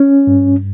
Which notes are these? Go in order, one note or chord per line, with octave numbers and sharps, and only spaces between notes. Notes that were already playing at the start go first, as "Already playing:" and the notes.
Already playing: C#4
G2